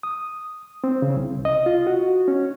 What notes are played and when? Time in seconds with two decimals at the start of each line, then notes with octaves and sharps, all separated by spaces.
0.03 D#6
0.84 C4
1.02 C#3
1.17 C2
1.45 D#5
1.66 F4
1.87 F#4
2.28 C#4